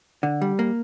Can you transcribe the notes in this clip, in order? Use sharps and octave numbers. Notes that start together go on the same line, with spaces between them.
D3
G3
A#3